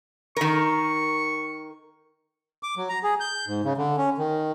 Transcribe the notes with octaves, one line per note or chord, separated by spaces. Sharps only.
D#3 A#4 C#6
D6
F#3
A#5
G#4
G6
G#2
C#3
D3
C#4
D#3